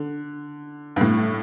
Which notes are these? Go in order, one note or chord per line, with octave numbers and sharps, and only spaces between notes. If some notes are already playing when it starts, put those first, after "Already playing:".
Already playing: D3
G2
A2